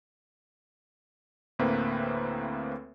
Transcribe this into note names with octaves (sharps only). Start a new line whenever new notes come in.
D2 A2 A#3 C4 B4